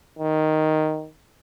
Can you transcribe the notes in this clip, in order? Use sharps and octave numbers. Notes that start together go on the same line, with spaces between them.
D#3